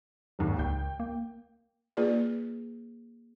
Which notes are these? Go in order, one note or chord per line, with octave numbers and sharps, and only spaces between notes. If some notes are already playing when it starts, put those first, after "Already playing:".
G#1 D#2 G#2
C#2 G5 G6
A#3
A#3 F4 G#4 B4 D5